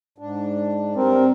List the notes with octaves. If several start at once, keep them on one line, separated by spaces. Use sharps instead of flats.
G#2 D4
G3 C4 A#4